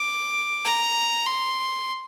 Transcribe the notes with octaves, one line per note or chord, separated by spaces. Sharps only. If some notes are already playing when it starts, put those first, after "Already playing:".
Already playing: D6
A#5
C6